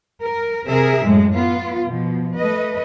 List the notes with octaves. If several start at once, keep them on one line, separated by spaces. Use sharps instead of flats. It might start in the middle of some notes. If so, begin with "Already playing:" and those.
A#4
C3 G#4 A#4 E5
F#2 A2 G#3
B3 F4
B2 F3
A3 B4 D#5